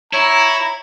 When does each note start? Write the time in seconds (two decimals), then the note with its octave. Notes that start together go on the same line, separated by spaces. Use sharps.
0.13 E4 C#5 A#5